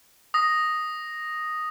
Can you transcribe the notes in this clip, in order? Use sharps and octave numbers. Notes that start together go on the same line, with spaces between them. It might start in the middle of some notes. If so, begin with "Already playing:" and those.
D#6 A#6